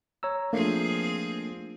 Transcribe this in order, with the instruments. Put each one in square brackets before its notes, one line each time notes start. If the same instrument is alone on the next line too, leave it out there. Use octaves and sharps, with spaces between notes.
[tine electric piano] C#5 A#5 E6
[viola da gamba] F3 C4 G#4 [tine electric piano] A3 A#3 D4